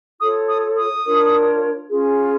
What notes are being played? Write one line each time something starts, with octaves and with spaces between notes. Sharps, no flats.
F4 A4 C#5 D#6
D#6
D#6
D4 F4 A#4 C#5
C#4 F4 G#4